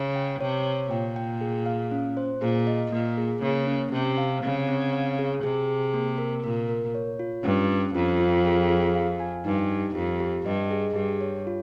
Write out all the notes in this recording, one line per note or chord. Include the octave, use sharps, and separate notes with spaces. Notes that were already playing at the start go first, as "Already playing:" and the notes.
Already playing: C#3
G5
C3 C#5
C#5
A#2 G5
G5
G#4
F5
C#4
C5
A#2 G#4
D#5
A#2 A#3
G#4
C#3 A#3
C#4
C3 G4
F5
C#3 C4
C4
F5
G#4
C3 G#4
G#4
A#3
A#4
A#2 A#4
A#4
C#5
F4
G2 C#4
C#4
F2 F4
F4
G#4
G#4
F5
G#5
G2 D#4
G4
F2 G4
G4
G2 D#5
G#4
G2 G4
C#5
F4